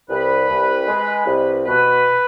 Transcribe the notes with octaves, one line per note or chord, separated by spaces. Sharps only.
C2 B4
C2
G#3
C2
B2 B4